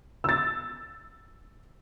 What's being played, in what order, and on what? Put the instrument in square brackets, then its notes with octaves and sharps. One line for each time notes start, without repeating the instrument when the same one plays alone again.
[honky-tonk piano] E6 A6